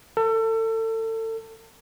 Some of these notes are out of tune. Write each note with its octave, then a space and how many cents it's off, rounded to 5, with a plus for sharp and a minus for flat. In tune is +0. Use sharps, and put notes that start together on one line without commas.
A4 +30